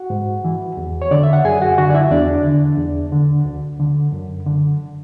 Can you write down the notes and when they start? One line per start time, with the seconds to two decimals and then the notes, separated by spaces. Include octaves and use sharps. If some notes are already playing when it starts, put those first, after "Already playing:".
Already playing: F#4 F#5
0.10 G#2
0.45 E3
0.77 E2
1.02 C#5
1.11 D3 D5
1.23 E5
1.33 F#5
1.45 F#2 G#4 G#5
1.62 F#4 F#5
1.78 D3 F#4 F#5
1.90 D5
1.94 E4 E5
2.11 E2 D4 D5
2.44 D3
2.78 E2
3.12 D3
3.45 D2
3.79 D3
4.12 F#2
4.46 D3